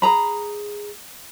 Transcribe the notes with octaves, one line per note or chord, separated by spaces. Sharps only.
G#4 A#5 B5